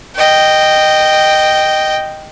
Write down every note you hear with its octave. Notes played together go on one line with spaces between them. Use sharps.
D#5 G5